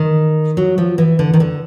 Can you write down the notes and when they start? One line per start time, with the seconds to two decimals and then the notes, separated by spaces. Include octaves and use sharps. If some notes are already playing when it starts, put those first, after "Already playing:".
Already playing: D#3
0.57 F#3
0.78 F3
0.98 E3
1.19 D3
1.33 D#3
1.40 D3